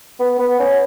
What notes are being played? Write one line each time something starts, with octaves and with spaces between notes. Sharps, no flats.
B3
B3
C#4